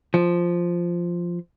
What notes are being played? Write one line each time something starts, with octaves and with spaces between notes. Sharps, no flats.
F3